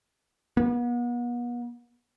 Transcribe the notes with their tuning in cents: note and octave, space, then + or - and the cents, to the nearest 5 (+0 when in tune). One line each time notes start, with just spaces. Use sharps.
B3 -40